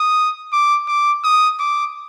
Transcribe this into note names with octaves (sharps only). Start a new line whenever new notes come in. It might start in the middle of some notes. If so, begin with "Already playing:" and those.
Already playing: D#6
D6
D6
D#6
D6